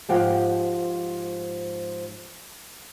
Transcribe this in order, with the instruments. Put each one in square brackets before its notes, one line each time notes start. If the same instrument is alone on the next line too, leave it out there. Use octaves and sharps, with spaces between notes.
[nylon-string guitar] G#2 F3 G4 F#5